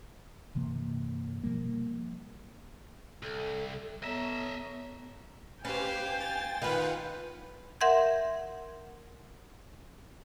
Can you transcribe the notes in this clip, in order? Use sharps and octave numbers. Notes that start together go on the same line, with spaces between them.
G1 C3 E3 A#3
B2 F3 G3 A#3
C2 A4
B3 A4 C#5 D#5 E5 A#5
C#4 G4 B4 C5 F5 G5 G#5
A6
D#3 F4 B4 F5 F#5
A#4 E5 F#5 C6 G6 G#6